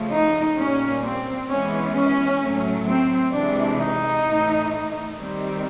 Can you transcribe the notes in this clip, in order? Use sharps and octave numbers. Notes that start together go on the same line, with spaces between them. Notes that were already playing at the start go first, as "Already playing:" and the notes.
Already playing: C#3 F3 A3
D#4
A#2 G3 A#3 C#4
C4
E3 G#3 B3 C#4
C#4
A2 F#3 A3
C4
C3 E3 G#3 D4
D#4
A2 E3 A3
D#3 G3 C4